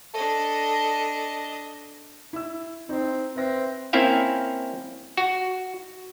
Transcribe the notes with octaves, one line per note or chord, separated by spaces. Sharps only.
D4 A4 D#5
E4 E6
C4 D#4
C4 B4 E5 A#6
A#3 C4 C#4 E4 E5 F5
F#4